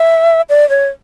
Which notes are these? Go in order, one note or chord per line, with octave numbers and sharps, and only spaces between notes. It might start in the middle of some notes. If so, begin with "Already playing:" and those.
Already playing: E5
D5
C#5